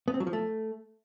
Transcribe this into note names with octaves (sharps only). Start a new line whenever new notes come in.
B3
C4
F#3
F3
A3